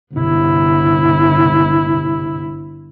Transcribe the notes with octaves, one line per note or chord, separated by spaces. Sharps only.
G1 E4